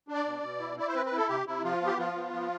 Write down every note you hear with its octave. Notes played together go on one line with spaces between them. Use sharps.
D4
D5
B2
B2
E4
E4 D5
C5
C4 B4
B4
E4
A4
C3 G4
C3 E4
F3 F4
B3
G4
F3 F4
B3
F3